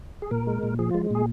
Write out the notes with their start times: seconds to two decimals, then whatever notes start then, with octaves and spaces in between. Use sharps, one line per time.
0.22 G#4
0.31 A#2 A#4
0.47 G#3
0.63 A#2
0.79 F3 G#4
0.91 G#3 F4
1.11 A#2 G#4